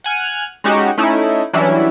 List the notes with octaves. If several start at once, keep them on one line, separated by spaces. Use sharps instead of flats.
F#5 G#5 F6 F#6
G#3 C#4 D#4 F#4 G4
A3 C#4 D#4 E4
E3 F#3 G3 C#4 D4 E4